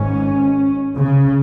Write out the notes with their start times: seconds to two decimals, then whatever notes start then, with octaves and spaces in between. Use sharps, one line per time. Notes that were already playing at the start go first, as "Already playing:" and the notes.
Already playing: G#1 G#2 C#4
0.97 C#3